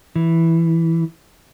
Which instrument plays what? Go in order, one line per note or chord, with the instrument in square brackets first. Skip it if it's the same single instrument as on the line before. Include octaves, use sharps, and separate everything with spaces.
[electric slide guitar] E3